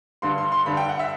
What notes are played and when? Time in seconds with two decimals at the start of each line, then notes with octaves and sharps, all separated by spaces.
0.22 G2 D3 C6
0.38 C6
0.52 C6
0.66 G2 D3 B5
0.77 G5
0.89 F#5
0.99 E5